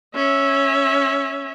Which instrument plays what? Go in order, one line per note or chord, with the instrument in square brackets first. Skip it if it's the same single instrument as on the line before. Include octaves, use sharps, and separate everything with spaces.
[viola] C#4 E5